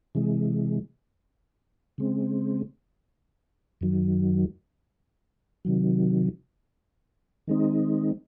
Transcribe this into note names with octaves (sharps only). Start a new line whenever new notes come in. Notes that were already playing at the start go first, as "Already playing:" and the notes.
C3 E3 G#3
C#3 G#3 C4
F#2 D#3 F#3
C3 D#3 F#3
D#3 G#3 C4 D#4